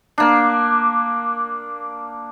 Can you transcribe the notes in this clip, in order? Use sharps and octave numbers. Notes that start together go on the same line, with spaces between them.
A#3 D4